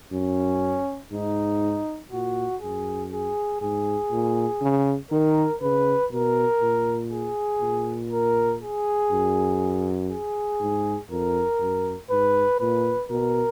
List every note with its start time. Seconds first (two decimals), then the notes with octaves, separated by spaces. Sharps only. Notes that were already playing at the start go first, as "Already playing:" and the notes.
0.12 F#2 C#4
1.12 G#2 D#4
2.11 A#2 F#4
2.62 F#2 G#4
3.12 G#4
3.62 G#2 G#4
4.12 A#2
4.62 C#3
5.11 D#3 A#4
5.62 C#3 B4
6.11 B2 A#4
6.61 A#2
7.12 G#4
7.61 A#2
8.10 A#4
8.61 G#4
9.11 F#2
10.11 G#4
10.60 G#2
11.10 F2 A#4
11.60 F#2
12.10 G#2 B4
12.60 A#2 B4
13.10 B2 A#4